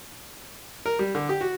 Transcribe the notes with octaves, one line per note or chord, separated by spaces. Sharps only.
A#4
G3
D3
G4
F#4